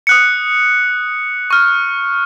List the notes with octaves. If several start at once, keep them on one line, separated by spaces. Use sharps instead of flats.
D#6 F#6 C#7
C#6 F6